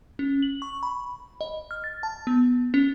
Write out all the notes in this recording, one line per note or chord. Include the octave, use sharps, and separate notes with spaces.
C#4
F#7
C#6
B5
D#5
F6
A6
A5
B3
C#4